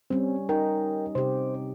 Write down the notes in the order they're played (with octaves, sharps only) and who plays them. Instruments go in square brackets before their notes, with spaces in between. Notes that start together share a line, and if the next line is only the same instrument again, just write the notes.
[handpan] G3 C#4 [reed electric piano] C4
[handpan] D#4 [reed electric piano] A#4 G5
[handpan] C3 G4 [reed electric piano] C5